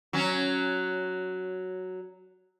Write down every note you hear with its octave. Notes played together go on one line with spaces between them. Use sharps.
F#3 C#4